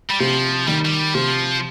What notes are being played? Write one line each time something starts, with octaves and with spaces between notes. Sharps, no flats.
G3
C3 F3
D#3 G3
G3
C3 F3